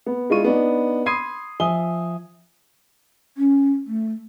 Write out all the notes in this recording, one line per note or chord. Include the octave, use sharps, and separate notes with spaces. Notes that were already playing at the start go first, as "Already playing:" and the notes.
B3
G#3 D4 E4 F4 C#6 D#7
B3 D4 D#4
B5 C6 D#6 G#6 C7 D#7
F3 E5 G#5 D#6 G7
C#4
A3